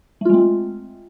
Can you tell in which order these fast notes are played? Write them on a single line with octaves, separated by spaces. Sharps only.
A3 F4 G#3 C4